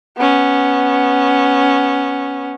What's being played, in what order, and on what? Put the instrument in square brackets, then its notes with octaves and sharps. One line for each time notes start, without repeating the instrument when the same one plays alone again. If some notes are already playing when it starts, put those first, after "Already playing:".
[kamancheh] B3 C#4